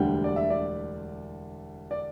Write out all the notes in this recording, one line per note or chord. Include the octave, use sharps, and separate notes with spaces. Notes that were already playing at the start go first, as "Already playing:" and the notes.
Already playing: E1 D2 D3 G3 G5
D5
E5
D5
D5